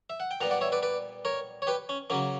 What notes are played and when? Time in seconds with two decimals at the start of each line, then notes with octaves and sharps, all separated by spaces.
0.10 E5
0.20 F#5
0.31 G5
0.41 A#2 G3 B3 F#5 A#5
0.51 D5 F#5
0.61 C#5 E5
0.72 B4 D5
0.83 B4 D5
1.25 A#4 C#5
1.62 C#5
1.67 G4 B4
1.89 C#4
2.10 C#3 F#3 A#3 C#4